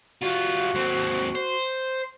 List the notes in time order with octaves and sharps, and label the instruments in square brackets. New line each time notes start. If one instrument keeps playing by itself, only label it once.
[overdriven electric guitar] G3 F4 [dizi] F#4
[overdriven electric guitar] D#2 C4
C5